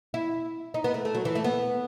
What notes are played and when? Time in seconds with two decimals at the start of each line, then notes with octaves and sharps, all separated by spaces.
0.14 E4
0.74 D#4
0.84 B3
0.94 A3
1.05 A3
1.15 F#3
1.25 E3
1.35 A3
1.44 B3